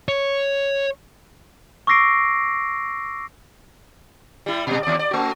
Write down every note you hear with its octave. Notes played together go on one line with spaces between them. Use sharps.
C#5
C#6 D6 E6 A#6 C7 D7
G3 E4
A#2 G3
D#2 D5
D5
A3 F#4